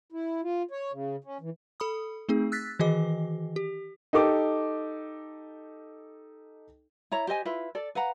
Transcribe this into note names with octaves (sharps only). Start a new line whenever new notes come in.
E4
F4
C#5
C#3
C#4
E3
A4 B5 D#6
A3 C4 D#4 G#4
E6 F#6 A6 B6
D#3 E3 F#4 G#4 D#5 D6
G4
D#4 G4 A4 D6
E4 C#5 A#5
G4 C5 D#5 G#5
E4 F4 B4
A4 D5
B4 F5 F#5 A#5